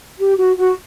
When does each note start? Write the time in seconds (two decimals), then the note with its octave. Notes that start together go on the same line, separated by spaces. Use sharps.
0.19 G4
0.39 F#4
0.58 F#4